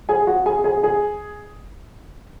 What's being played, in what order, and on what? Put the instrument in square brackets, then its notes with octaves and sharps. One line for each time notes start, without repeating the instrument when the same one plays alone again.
[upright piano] G#4 G#5
F#4 F#5
G#4 G#5
G#4 G#5
G#4 G#5